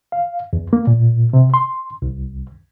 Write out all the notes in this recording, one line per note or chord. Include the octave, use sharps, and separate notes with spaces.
F5
E2
A#3
A#2
C3
C6
C2